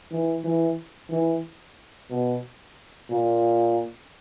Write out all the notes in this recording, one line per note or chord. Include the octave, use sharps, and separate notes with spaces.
E3
E3
E3
B2
A#2